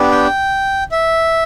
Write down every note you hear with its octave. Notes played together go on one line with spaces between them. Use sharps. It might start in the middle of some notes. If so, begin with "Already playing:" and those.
Already playing: B3 D4 G4
G5
E5